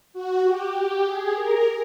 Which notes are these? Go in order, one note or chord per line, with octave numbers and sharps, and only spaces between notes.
F#4
G4
G4
G#4
A#4